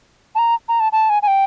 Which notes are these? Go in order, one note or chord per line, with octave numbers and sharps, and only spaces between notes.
A5
A#5
A#5
A5
A5
G#5
G#5
G5